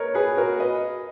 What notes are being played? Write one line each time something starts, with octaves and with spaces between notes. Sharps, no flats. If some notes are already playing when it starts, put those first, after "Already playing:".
Already playing: A#4 B4 C#5 D#5
G#4 B4
F#4 A#4
B4 D#5